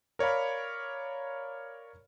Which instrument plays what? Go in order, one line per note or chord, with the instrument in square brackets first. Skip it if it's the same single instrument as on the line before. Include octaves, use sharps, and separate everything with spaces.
[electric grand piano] A#4 C#5 D5 F5 B5